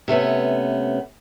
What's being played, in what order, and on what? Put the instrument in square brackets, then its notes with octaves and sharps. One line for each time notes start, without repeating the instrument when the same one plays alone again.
[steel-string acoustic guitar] C3 A3 B3 C#4